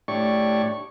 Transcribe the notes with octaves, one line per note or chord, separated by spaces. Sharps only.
A2 D4 G4 C#5 D5 C#6